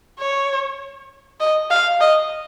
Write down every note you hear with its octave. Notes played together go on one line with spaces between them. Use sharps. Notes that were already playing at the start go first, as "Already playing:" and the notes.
C#5
D#5
F5
D#5